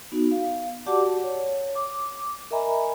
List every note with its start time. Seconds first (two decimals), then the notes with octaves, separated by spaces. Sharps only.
0.12 B3 D#4 F#4
0.31 F5
0.86 F#4 G4 D5 F#5 A5 D6
1.24 C#5
1.75 D6
2.51 A#4 D#5 E5 G#5 A#5 B5